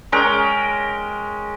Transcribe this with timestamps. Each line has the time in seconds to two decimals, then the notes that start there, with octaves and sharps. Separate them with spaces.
0.12 G#3 C#4 A#4 G5